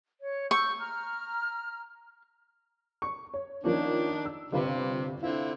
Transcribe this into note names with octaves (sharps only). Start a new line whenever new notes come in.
C#5
C#6 E6 G6
A#5 F6
C#6
C#5
D#3 F3 A#3 C#4 D4
E6
G1 C3 F4 B4
D3 C4 E4 F4